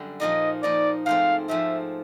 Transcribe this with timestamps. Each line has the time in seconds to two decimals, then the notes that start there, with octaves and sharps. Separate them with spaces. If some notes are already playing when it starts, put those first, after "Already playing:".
Already playing: F#2 D3 G3
0.20 A#2 F3 A#3 D#4 D#5
0.63 A#2 F3 A#3 D#4 D5
1.06 G#2 F3 A3 C4 F5
1.48 G#2 F3 A3 C4 E5